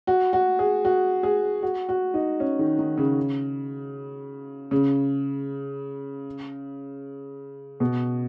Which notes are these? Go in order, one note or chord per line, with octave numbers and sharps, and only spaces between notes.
F#4
F#4
G#4
F#4
G#4
F#4
F#4
D#4
C#4
D#3
D#3
C#3
C#3
B2